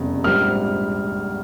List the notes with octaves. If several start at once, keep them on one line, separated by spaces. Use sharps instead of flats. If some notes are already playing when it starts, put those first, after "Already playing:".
Already playing: F1 E2 C#3 G3
A#1 G#2 G3 C4 F6